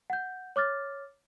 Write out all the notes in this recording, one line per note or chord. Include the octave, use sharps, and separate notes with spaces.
F#5 G6
C#5 D6 F6 A6